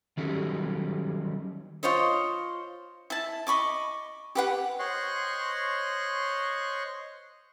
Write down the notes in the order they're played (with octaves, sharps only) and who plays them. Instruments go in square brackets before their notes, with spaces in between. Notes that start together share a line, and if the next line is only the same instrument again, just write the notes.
[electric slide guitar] D#3 F#3 G3 C#4 A4
[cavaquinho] F4 C5 C#5 D#5
E4 A5
D#5 B5 C#6 D6
G4 B4 F#5
[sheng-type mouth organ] C5 C#5 D#5 C6 C#6 F#6